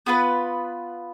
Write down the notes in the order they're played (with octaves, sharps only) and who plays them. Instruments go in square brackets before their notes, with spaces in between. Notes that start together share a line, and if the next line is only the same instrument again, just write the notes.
[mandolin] B3 F4 B4